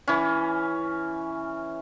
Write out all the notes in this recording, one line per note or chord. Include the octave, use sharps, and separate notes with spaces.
E3 C#4